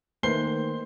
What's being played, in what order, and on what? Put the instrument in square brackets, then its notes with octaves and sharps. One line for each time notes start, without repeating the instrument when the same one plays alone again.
[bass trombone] D#3 [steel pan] A3 A#3 B4 [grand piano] C5 C7 G7